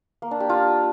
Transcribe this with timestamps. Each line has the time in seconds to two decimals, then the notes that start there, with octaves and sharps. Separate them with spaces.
0.22 A#3
0.31 D4
0.40 G4
0.49 F4